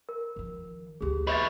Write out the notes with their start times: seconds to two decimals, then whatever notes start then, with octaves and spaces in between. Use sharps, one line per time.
0.09 A#4
0.36 D#3 F3
1.01 D2 D#3 G4 G#4
1.27 B4 C#5 D#5 E5 A6